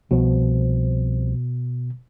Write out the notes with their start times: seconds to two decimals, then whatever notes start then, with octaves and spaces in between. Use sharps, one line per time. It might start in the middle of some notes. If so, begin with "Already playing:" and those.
0.11 C2 B2 F3